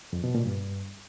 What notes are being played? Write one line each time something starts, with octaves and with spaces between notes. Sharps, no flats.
F2
B2
A#2
G2